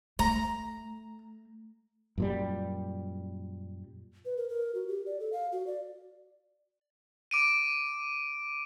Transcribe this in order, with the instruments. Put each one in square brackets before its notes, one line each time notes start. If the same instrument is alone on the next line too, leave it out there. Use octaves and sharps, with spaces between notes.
[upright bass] A3 [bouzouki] A#5
[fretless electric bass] F#2 A#2 G3
[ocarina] B4
A#4
A#4
F#4
G4
D5
A4
F5
F#4
D5
[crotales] D6 D7 D#7